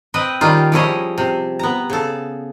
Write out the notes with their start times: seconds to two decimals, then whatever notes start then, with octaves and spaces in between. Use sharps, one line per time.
0.14 C4 B4 D#5 G5
0.41 D#3 G3 C#4 D#4 F4
0.72 F3 G3 E4 G#4 C#5 D#5
1.18 C3
1.59 B3 A#5
1.90 C#3 A4